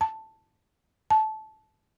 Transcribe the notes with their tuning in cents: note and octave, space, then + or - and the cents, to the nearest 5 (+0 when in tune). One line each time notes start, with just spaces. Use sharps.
A5 +5
A5 -20